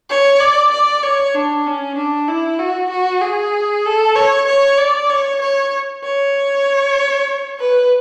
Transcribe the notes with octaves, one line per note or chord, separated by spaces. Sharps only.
C#5
D5
D5
C#5
D4
C#4
D4
E4
F#4
F#4
G#4
A4
C#5
C#5
D5
C#5
C#5
C#5
B4